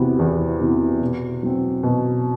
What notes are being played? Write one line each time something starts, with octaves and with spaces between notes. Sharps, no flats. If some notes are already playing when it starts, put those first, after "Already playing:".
Already playing: E2 C3 E3 B3 F#4
E2
C3 E3 B3 F#4
B2
F#3 C4 F#4
B2